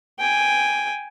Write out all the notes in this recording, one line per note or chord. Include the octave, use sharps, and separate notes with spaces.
G5 G#5